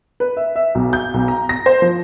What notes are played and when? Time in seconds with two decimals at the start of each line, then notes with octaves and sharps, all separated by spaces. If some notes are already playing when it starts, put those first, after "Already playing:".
0.20 B4
0.37 E5
0.56 E5
0.75 B1
0.93 G6
1.14 B1
1.28 A#5
1.49 A#6
1.66 C5
1.82 F3